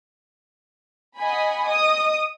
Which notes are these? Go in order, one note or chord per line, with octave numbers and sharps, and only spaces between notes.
D#5 F#5 G#5 B5
D#5 D#6